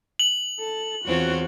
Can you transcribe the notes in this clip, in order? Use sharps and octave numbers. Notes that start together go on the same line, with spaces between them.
F#7
A4
E2 C4 F4 F#4 C#5